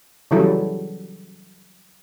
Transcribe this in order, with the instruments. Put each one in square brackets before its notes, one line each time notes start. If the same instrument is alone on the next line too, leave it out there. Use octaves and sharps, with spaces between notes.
[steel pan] C#3 E3 F#3 G3 E4 A4